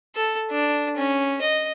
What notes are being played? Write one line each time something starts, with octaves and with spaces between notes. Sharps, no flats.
A4
D4
C#4
D#5